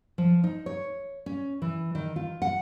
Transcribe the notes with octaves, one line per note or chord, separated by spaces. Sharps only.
F3
D#4
C#5
C#4
E3
D#3
F4
F#5